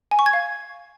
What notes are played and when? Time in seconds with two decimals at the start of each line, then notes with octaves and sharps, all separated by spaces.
0.11 G#5
0.19 C#6
0.26 G#6
0.33 F5